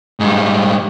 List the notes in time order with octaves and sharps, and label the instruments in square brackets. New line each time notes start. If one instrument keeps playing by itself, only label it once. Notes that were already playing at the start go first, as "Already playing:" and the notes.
[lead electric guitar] G#2 G3